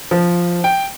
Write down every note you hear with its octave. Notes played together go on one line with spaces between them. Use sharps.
F3
G5